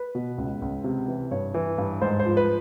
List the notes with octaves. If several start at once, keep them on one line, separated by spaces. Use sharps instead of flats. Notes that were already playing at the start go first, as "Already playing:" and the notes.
Already playing: B4
B2
C#2
C#2
C3
E3
G2 C#5
E3
G2
G#2 C5
C5
F3
B4